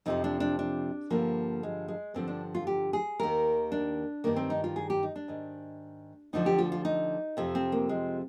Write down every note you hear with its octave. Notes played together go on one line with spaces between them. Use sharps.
F2 C3 F3 D#4
D4
D4
D4
G2 D3 F3 A#3
G#3
G#3
G2 D3 F3 C4
D4
F4
G4
G#4
D#2 D#3 A#4
D4
G2 D#3 A#3
C4
D#4
F4
G#4
G4
D#4
D4
G#2 D#3
D2 D3 F3 D#4
G4
F4
F4
D#4
F2 C3 F3
C4
A#3
G#3